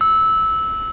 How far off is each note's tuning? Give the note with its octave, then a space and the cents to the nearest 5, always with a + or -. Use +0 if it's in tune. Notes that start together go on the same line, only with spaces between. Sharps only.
E6 -15